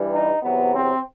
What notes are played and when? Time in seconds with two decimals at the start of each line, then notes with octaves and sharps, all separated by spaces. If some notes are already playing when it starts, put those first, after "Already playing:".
Already playing: G2 E3 G3
0.12 D#4
0.42 E2 C3 F#3 B3
0.73 C4